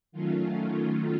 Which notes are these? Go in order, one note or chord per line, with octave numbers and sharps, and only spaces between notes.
D#3 F#3 A3 C#4 F4